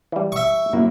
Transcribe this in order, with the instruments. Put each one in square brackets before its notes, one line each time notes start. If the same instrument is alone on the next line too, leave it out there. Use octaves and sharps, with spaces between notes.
[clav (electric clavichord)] E3 G3
[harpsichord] E5 C#6
[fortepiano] F#2 A#3 E4 [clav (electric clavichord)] F#4